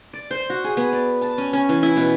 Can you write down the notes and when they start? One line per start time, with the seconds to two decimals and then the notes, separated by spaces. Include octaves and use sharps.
0.13 D5
0.31 C5
0.50 F#4
0.64 G#4
0.77 B3
0.93 D5
1.21 A5
1.38 C#4
1.53 C#4
1.69 E3
1.83 E4
1.96 B2